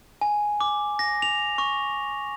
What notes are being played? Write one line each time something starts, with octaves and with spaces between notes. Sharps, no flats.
G#5
D6
A#6
F7
C#6